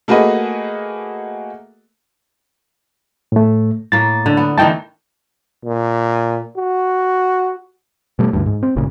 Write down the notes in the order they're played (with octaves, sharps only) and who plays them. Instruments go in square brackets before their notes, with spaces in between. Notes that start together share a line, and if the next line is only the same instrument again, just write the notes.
[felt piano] A3 A#3 F#4 G#4 B4 D#5
[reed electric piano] A2 A3
[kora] A2 A#3 [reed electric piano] A6
[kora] D3
B3
[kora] D#3 E3 A3 [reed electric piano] D#5 G5 A5
[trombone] A#2
F#4
[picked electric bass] B2 G3 A3
D2 G2
G#2
C4
G#1 G2 A#2 C#3